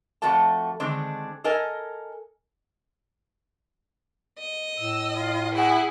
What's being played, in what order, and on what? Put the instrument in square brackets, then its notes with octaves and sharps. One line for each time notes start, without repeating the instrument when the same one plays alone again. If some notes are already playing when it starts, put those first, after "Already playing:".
[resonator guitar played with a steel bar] F2 A3 F#4 A4 A5
D3 D#3 G#3 C4 D4
A4 A#4 D#5 G#5
[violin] D#5
[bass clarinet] A2 [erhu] E6
[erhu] F4
[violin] E4 [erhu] G#4 [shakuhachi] F#5